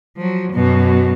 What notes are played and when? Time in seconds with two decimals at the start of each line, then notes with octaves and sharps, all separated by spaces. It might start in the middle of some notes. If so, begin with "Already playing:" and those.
0.17 F3 F#3
0.52 F#2 B2